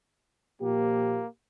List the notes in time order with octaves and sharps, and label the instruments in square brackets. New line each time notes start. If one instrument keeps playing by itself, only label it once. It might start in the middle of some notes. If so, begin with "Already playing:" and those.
[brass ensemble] A#2 F3 G4 [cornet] A#3